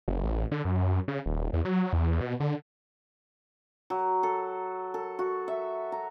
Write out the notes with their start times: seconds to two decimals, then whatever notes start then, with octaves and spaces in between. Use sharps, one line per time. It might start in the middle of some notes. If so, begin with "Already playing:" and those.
0.08 F#1
0.24 A1
0.52 D3
0.65 F#2
1.08 C#3
1.26 D#1
1.53 E2
1.65 F#3
1.93 E2
2.21 B2
2.40 D3
3.90 F#3
4.23 A4
4.94 A4
5.19 F#4
5.48 E5
5.92 A#5